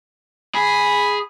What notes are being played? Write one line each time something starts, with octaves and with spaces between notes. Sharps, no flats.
G#4 B5